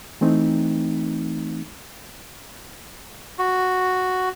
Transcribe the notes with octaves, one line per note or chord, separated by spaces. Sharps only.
E3 A3 C4 D#4
F#4